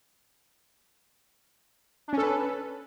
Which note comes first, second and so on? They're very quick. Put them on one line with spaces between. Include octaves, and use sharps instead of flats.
D4 C#4 A4 B4